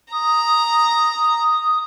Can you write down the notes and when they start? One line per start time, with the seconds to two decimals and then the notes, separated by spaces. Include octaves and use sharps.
0.12 A#5 D#6